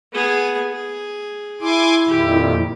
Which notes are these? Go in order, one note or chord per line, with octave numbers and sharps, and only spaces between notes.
B3 G#4
G#4
E4 G#5 C6 D6
F2 A#2 D#3 G4